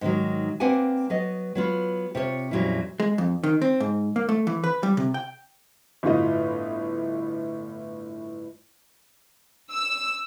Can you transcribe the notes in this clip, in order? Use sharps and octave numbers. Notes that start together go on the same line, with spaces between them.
G#2 D3 D#3 F#3
A#3 C4 B4 D5 F#5 G#5
F#3 B3 D#5
F#3 B3 F4
C3 F4 C#5
F2 A#2 F#3 G3 C#4 E4
G#3
F2
D#3
C4
G#2
A#3
A3
E3
B4
G3
C3
G5
G1 A2 F4 D#5
E6